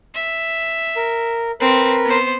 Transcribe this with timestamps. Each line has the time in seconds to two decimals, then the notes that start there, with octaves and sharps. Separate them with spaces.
0.14 E5
0.96 A#4
1.61 C4 A#4 B4
2.06 B3 C5